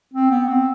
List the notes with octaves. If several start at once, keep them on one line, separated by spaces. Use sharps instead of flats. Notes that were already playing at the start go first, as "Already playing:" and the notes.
C4
B3
C4